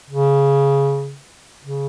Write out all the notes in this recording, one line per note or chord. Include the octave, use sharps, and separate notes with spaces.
C#3
C#3